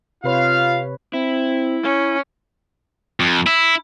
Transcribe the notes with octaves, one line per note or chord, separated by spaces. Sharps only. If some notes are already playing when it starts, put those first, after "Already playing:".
C3 F4 B4 C#5 F5
C4 E4
C#4
F2
E4